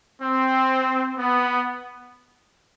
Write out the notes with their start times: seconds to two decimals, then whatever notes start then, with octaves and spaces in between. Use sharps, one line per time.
0.22 C4
1.18 B3